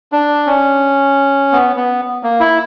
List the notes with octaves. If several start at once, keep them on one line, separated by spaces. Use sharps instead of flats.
D4
C#4
B3
B3
A#3
E4